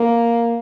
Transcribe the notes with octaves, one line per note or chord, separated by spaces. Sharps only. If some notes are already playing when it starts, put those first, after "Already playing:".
Already playing: A#3